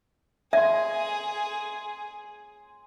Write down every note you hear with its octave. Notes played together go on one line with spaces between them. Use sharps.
G#4 E5 G#5 C6